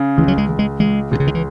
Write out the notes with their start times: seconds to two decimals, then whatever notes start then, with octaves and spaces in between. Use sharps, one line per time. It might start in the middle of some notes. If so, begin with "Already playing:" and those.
Already playing: C#3
0.17 C#2 E3
0.28 F#3
0.38 G#3
0.49 C#2
0.59 G#3
0.80 C#2 G#3
1.11 C#2 B2
1.20 C#3
1.27 D#3
1.35 E3